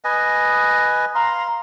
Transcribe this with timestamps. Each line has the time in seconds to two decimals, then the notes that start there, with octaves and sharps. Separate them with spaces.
0.04 B4 D#5 G#5
1.15 F5 A#5 C6